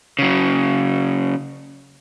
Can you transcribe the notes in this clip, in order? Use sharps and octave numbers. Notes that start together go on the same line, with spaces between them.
C#3 F#3